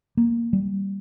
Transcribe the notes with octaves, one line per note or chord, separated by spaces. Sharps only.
A#3
G3